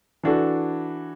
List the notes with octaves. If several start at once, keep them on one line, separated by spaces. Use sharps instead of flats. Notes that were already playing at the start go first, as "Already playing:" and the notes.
E3 D4 F#4 A4